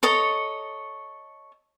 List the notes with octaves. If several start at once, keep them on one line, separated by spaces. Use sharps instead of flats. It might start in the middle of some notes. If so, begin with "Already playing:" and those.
A4 C#5 D#5 A#5